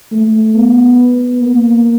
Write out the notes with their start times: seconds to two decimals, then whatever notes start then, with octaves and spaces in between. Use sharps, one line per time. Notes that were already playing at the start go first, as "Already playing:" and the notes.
0.12 A3
0.55 B3
1.42 A#3